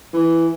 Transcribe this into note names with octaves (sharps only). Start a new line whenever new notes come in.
E3